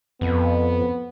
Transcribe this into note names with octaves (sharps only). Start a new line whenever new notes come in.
F2 B3